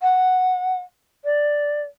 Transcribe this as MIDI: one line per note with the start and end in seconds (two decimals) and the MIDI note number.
0.01 0.80 78
1.24 1.81 74